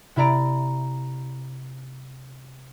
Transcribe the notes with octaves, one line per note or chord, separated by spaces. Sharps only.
C3 E4 D5 A#5 D7